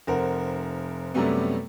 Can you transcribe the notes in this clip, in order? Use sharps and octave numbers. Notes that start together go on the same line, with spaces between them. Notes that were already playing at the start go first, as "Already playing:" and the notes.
F1 A#4 C5 F#5
F#2 C3 F#3 G3 A3 B3